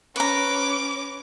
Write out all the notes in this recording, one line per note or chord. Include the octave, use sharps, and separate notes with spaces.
C#4 B4 A#5 D6